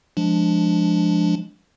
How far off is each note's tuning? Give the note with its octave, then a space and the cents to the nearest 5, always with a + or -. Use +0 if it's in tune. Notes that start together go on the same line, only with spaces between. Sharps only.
F3 +0 G#3 +0 D4 +0